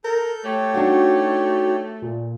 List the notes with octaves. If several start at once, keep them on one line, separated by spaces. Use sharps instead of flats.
A4 A#4 G6
A3 G4 C#5
D4 D#4 F#4 F#5
A#2